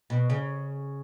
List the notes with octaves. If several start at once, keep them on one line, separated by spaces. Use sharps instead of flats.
B2
C#3